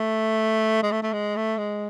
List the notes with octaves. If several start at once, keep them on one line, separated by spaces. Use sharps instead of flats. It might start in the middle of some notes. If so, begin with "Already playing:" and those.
Already playing: A3
G#3
A3
A3
G#3
A3
G#3